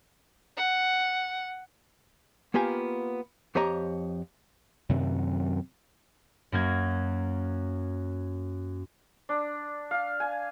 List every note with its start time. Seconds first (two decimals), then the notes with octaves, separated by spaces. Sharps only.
0.57 F#5
2.54 A#3 B3 F4 G4 G#5
3.55 F2 G4 C5 C#5 D#5 A#5
4.89 F#2 C3 D#3 F#3
6.52 F#2 A#3 G#6
9.29 D4
9.91 F5
10.20 G#5